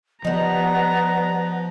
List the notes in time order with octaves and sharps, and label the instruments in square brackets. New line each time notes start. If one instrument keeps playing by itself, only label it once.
[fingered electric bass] F3 [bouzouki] G3 D#4 [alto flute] B3 [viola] A#5